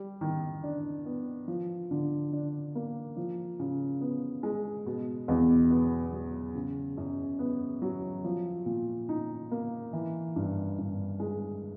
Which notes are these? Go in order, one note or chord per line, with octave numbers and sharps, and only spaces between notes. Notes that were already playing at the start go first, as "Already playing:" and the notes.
Already playing: G3
D#3
D4
B3
F3
D3
D4
A#3
F3
C#3
B3
G#3
B2
E2
B3
F#3
C#3
F#2
B3
F#3
F3
A#2
D#4
A#3
E3
G2
G2
G#3